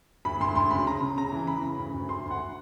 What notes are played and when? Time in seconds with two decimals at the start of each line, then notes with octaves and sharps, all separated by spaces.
0.25 D2 B5
0.41 D2 C6
0.55 D2 C6
0.71 C#3 B5
0.86 C#3 A#5
1.01 C#3
1.18 C#3 A#5
1.32 E3
1.47 E3 B5
1.63 C#3
1.79 D2
1.94 D2
2.09 D2 C6
2.26 D2
2.31 F#5